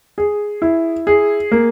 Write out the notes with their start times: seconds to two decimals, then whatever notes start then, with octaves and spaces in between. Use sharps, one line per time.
0.18 G#4
0.62 E4
1.07 G#4
1.52 A#3